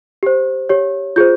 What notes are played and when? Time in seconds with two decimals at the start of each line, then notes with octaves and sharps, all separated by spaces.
0.23 G4 C5
0.69 G4 C#5
1.16 F4 G#4 C5 G6